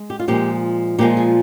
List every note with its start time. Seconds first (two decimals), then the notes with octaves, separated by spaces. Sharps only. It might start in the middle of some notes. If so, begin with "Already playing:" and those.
Already playing: G#3
0.10 G4
0.19 F4
0.28 A#2 F3 G#3 G4
0.99 A#2 F3 G#3 G4
1.17 G#4